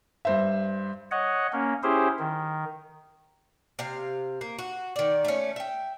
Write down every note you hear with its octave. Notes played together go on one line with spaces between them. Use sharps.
G2 C5 E5
C#5 D#5 F#5
A#3 C#4
C#4 E4 G4 G#4 C5
D#3
C3 F5
A#3
F#4
D#3 D5
A3 C#4
E5 G5